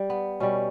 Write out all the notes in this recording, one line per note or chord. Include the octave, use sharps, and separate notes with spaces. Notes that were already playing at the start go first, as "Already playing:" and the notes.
Already playing: G3
B3
B2 G3 C#4